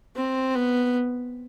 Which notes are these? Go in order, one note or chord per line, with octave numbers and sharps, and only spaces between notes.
C4
B3